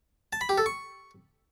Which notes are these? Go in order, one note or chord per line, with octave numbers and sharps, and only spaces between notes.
A5
B5
G4
A4
C#6